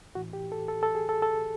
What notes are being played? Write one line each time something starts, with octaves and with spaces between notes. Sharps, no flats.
A2 E3 F#4
G4
A4
A4
A4
G#4
A4
A4